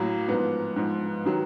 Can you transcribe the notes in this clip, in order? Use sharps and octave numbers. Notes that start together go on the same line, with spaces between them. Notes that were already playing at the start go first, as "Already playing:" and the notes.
Already playing: A2 F#3 A#3
G#2 F3 B3
G#2 F3
D#3 F#3